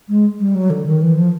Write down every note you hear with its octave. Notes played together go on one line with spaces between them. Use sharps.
G#3
G3
F#3
D3
D#3
E3
F3